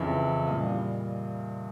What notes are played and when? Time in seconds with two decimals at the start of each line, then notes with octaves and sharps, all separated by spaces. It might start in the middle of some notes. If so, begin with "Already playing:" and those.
Already playing: F2 C#3 E3 E5
0.47 A#2 G3 D#5 F5